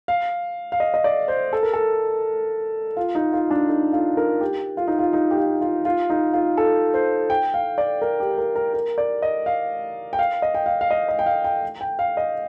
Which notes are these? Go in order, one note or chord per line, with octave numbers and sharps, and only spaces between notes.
F5
F5
D#5
D#5
D5
C5
A4
A#4
A4
F4
D#4
F4
D4
D#4
F4
A#4
G4
F4
D#4
F4
D#4
G4
F4
F4
F4
D#4
F4
A4
C5
G5
F5
D5
A#4
G4
A#4
A#4
A#4
D5
D#5
F5
G5
F5
D#5
G5
F5
F5
D#5
D#5
G5
F5
G5
G5
F5
D#5